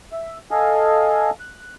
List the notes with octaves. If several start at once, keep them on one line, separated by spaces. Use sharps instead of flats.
E5
A4 D#5 F5 G#5
F#6